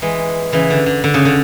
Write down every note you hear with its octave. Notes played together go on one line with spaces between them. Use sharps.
E3 G#3
C#3 E3
D3
D3
D3
C#3
D3